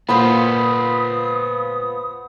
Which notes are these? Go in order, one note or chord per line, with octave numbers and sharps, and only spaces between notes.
A#2 B3 F4 C5 F#5 B5 D#6